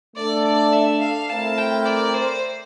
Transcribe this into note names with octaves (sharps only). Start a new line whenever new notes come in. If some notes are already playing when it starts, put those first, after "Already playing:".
A3 D4 A4 D5
D5
E5
F5
A3 C4 E4 A#4 A5
G5
D5
C5